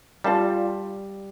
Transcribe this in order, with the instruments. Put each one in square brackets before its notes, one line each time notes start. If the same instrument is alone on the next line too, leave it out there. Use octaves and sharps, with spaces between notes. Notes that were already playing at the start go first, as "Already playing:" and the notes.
[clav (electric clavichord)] G3 [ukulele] F4 D5 F5 A5